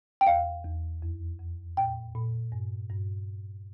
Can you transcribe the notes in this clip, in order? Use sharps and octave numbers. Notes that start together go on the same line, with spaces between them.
G5
E2 F5
E2
F2
F2
A#2 G5
A#2
G2
G2